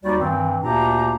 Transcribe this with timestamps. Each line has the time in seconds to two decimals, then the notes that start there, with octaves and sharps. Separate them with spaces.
0.04 D#2 G3 D#4 F#4 D5
0.19 G2 D#3 E3 C4
0.63 D2 A#2 A#3 D4 G4 A#5